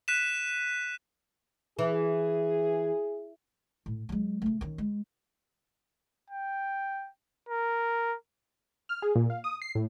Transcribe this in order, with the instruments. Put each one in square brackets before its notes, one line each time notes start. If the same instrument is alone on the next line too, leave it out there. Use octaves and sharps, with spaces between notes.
[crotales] F#6 B6 D#7 E7
[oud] E3 [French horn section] G#4
[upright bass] A2
F#3 G#3
C#3 A3
D#3 C#4
G#3
[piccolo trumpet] G5
A#4
[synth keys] F6
G#4
A#2
F5
D#6
C7
A2